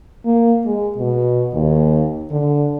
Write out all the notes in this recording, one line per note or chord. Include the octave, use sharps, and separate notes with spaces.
A#3
G#3
B2
D#2
D3